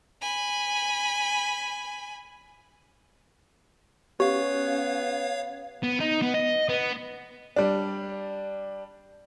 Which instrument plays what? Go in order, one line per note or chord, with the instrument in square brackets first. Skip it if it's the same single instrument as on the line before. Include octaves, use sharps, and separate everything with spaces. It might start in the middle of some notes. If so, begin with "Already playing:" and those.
[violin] G#5 B5
[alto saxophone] B3 [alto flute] C#4 [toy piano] G4 [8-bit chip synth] C#5 F5
[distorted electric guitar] B3
D#4
B3
D#5
B3
[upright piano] G3 D4